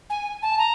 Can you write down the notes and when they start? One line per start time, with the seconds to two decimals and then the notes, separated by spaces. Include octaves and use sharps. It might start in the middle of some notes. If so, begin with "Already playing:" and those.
0.10 G#5
0.43 A5
0.59 A#5